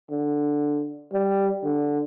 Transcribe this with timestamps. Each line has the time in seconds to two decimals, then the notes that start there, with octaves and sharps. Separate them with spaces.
0.11 D3
1.13 G3
1.64 D3